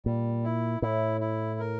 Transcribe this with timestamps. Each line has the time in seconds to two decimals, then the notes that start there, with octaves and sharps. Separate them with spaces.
0.06 A#2 G3
0.44 E4
0.82 A2 E4
1.21 E4
1.60 A#4